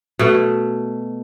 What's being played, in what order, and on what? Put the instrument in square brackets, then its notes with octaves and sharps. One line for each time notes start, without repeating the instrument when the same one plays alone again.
[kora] B2 A3